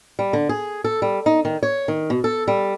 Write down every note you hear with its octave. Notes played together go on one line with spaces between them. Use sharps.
G3
D3
G#4
A4
G3
D#4
D#3
C#5
D#3
B2
A4
G3